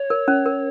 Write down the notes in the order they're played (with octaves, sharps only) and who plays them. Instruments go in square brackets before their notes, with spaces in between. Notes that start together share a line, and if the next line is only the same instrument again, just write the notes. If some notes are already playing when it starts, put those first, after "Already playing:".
Already playing: [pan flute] C#5
[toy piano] A#4
C#4
A#4